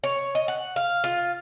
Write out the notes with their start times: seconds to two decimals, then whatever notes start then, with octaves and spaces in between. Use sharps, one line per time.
0.04 C#5
0.35 D#5
0.48 F#5
0.76 F5
1.04 F4